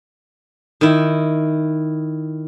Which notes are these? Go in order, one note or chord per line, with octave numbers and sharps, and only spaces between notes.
D#3 E4